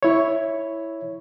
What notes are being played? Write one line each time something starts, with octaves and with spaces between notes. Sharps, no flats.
E4 C#5